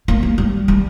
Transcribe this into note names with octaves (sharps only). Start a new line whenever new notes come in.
A#3
G3
G3
G3